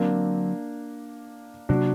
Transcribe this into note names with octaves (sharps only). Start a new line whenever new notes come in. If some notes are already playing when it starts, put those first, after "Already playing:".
Already playing: D3 F#3 A#3 C4 D4
C3 F#3 A#3 D4 F#4